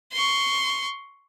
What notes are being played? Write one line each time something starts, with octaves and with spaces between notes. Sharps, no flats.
C6 C#6